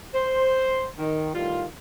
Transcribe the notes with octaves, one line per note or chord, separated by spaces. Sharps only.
C5
D#3
A2 D#3 G3 F4